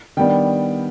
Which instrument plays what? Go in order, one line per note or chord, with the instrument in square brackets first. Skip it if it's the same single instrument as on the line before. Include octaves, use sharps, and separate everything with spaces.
[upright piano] D#3 G3 B3 D4 G5